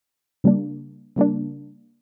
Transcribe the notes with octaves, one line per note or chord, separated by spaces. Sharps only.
C#3 G3 A#3 D4
C#3 G3 A#3 D4